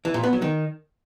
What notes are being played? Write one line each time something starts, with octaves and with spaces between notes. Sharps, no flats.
E3
A#2
B3
F#3
D#3